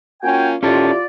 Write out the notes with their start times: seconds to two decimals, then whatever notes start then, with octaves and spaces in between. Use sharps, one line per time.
0.23 A#3 C#4 F4 F#4 G5 G#5
0.63 D#3 C#4 E4 F4 G4 A4 D5